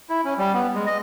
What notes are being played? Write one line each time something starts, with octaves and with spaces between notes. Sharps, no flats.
E4
C#4
G3
B3
G#3
D#5